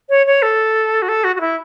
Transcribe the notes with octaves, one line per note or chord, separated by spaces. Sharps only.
C#5
C#5
A4
F#4
A4
F#4
F#4
E4